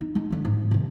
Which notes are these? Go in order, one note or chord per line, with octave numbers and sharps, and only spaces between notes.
D#4
G#3 D#4
D3 D4
G#2
C3 D#3